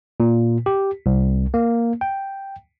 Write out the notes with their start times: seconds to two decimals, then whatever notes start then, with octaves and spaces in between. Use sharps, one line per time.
0.20 A#2
0.66 G4
1.06 C2
1.54 A#3
2.01 G5